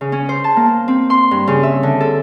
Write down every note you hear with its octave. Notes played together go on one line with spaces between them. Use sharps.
C#3
C#4
C5
A5
A#3
C4
C6
G2
C#3
E5
D3
A4